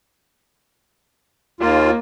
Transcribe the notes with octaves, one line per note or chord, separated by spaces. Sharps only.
D#2 A#3 F4